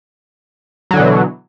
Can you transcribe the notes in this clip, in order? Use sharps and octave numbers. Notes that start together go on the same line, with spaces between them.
B2 D3 E3 F#3